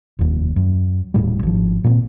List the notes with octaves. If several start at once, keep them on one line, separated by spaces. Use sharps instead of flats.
F1 D#2
F#2
D#1 C2 A2 G3
G#1 F3
A#2 G3 C4